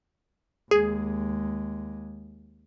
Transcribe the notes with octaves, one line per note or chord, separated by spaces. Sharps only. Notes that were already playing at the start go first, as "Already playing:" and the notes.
D#2 G#3 G#4